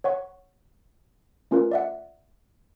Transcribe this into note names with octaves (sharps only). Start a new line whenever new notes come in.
C#5 F#5 C#6
A3 C#4 F4 A#4 B4
D5 E5 F#5